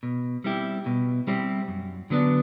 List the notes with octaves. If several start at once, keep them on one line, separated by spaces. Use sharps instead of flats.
B2
G3 C4 E4 G4
B2
G3 C4 E4 G4
F#2
D3 F#3 B3 D4